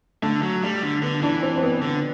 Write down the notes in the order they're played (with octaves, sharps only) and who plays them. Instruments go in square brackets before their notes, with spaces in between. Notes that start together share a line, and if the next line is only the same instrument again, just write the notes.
[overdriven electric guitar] D3 [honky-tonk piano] A3
[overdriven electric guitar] F#3
[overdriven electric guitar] G3 [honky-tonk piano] A3
[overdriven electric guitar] D3
[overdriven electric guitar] D3 [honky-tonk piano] B3
[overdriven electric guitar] E3 [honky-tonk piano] D4
[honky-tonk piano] C4
C4
B3
[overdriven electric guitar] D3